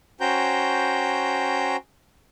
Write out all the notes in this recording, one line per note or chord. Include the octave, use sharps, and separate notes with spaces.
C#4 F#4 C5 G5 A#5 G6